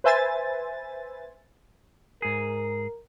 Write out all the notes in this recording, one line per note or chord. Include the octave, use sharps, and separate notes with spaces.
B4 C5 E5 G#5 A6
G#2 G#4 A#4